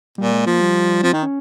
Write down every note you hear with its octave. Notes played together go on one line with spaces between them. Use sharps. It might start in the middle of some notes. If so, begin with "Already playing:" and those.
A#2 G3
G#3
F3 A#3
G3
F3 C4
D#3 D#4
C#4